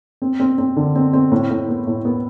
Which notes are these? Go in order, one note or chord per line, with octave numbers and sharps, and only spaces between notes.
C4
C4
C4
D3
C4
C4
A2
A2
B3
A2
B3